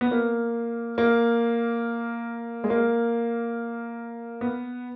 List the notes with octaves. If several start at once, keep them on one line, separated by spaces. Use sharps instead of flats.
B3
A#3
A#3
G#3
A#3
B3